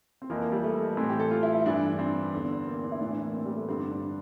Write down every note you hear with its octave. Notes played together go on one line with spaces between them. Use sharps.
C4
F2 E3 A#3
A#3
G3
A3
A2 E3 C4
G4
A4
F4
E4
E4
G2 E3 D4
D4
C4
E2 D3
A#3
C4
D4
E4
A2 E3 D4
A#3
C4
G3
A3
G2 D3 C4
D4
D4